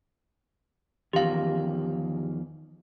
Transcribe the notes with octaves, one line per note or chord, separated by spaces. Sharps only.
E2 D#3 F3 G4 F5